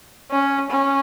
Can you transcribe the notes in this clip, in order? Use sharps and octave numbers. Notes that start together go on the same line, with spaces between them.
C#4
C#4